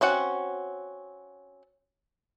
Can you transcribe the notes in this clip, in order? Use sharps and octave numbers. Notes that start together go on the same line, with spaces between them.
C4 C#4 F#4 F#5